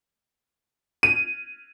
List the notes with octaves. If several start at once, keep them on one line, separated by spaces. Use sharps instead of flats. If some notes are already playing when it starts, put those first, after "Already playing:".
D#7